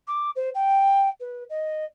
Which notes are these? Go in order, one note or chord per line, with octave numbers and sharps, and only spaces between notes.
D6
C5
G5
B4
D#5